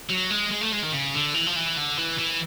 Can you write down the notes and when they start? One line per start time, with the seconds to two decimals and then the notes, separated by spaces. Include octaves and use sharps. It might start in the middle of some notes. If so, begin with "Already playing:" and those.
0.09 F#3
0.31 G#3
0.51 G#3
0.62 A3
0.73 G#3
0.83 D#3
0.93 C#3
1.15 D3
1.34 E3
1.47 F3
1.56 E3
1.77 D3
1.98 E3
2.19 E3